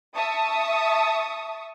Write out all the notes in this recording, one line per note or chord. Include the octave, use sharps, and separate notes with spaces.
E5 A5 C#6 D#6